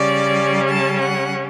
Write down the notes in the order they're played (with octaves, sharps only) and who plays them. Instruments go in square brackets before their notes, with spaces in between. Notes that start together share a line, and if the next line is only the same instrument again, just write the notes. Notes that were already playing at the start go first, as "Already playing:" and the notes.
Already playing: [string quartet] C#3 G3 C#4 D5
A5
F#5